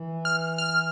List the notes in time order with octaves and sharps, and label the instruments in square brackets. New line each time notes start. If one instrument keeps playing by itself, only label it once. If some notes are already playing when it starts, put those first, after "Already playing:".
Already playing: [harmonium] E3
[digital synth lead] F6
F6